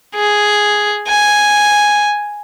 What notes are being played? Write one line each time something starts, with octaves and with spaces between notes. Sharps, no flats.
G#4
G#5